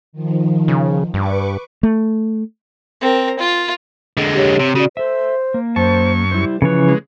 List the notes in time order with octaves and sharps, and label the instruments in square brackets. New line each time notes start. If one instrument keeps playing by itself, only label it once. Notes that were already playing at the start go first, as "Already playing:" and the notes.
[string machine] D#3 F3
[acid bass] C#3
[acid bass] G2 [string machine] B4 C#6 D6
[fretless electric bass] A3
[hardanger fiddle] C4 A#4
F4
[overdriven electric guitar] D3 G#3
[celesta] G4 C#5
[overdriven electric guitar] C3
[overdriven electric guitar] C#3 [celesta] F#4 D5
[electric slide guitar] A4 E5 [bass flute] C5
[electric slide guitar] A#3
[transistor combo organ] F#2 C#6 [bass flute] C5 [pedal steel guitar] A5
[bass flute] G3 [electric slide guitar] E4 C5
[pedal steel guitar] C#3 E3 C#5 [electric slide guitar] F3 [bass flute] B4
[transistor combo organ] G#3